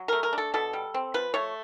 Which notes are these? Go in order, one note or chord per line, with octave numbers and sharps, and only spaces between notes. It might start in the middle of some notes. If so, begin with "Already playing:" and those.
Already playing: F#3
A3 A#4
A#4
D4
A4
B2 A4
G3
C4
F3 B4
A3 C#5